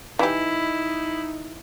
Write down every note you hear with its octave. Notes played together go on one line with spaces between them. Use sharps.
E3 D#4 E4 G4